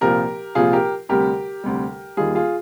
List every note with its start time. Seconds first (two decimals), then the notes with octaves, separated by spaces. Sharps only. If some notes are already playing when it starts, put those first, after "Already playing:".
0.01 C2 A#2 F3 G4 A#4
0.55 C2 A#2 F3 F4 G#4
0.73 G4 A#4
1.09 D2 C3 G3 G4 A#4
1.64 D2 C3 G3
2.17 D#2 D#3 G3 F4 G#4
2.35 F4 G#4